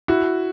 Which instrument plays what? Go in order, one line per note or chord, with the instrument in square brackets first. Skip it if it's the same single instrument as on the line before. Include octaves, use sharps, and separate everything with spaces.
[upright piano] E4 [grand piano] F#4